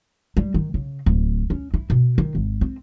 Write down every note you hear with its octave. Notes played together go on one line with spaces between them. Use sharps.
G3
D#3
C#3
D1
C#4
E4
B2
D#3
G#1
C4